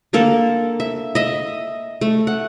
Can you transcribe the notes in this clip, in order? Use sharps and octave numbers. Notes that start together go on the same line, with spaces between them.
D3 A#3 A4
E5
D#5 E5
A3
F#5